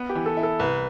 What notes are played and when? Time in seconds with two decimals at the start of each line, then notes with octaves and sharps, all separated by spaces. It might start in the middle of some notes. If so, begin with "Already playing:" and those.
Already playing: B3
0.09 G4
0.15 E3
0.26 A4
0.37 E4
0.43 A4
0.60 C2 B4